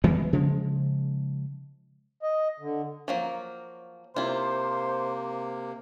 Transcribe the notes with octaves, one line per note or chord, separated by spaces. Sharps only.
E3 G#3 B3
C#3 F3 G#3
D#5
D3
F3 F#3 A#3
C3 A#3 E4 F4 C5